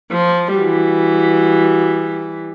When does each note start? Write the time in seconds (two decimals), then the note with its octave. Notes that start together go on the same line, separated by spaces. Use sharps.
0.11 F3
0.55 E3 G3 F#4